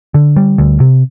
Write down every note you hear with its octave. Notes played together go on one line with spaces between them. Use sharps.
D3
G3
D2
C3